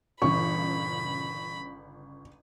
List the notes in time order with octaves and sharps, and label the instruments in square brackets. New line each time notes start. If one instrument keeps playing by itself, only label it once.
[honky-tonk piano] G1 C#3 [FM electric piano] A#2 E3 [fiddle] B5 [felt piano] C#6